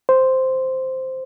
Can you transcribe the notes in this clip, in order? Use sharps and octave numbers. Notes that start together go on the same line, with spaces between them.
C5